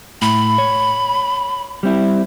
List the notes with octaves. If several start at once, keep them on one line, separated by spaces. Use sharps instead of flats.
A2 B5
C#5
G3 C4 E4